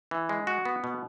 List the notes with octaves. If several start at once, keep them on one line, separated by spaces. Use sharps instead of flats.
E3
G#3
F#4
B3
B2